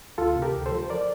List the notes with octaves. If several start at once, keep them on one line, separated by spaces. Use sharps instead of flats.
D2 F4 A4
C3
G4 A#4
D2
A4 C5
F3
A#4 D5